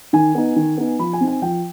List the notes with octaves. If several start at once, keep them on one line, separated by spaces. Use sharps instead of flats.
D#3 G#5
B3 D#4
D#3
B3 D#4
F3 B5
G#5
C4 D#4
G#5
F3 G5